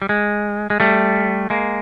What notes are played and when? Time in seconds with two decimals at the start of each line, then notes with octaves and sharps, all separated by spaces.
0.02 G3
0.09 G#3
0.70 G#3
0.80 G3 A3
1.50 G#3 A#3